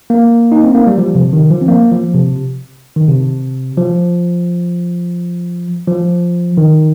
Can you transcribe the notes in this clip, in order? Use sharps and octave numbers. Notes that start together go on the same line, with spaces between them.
A#3
D#4
C4
A#3
G3
F3
C3
D#3
F3
C4
A#3
F3
C3
D#3
C3
F3
F3
D#3